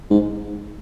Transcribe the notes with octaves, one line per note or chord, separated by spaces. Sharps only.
G#2